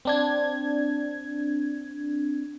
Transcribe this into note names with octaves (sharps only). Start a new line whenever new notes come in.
C4 D4 G#6